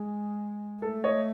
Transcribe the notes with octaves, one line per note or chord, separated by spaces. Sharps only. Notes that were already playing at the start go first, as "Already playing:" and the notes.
Already playing: G#3 G#4
A3 A4
C#5 D#5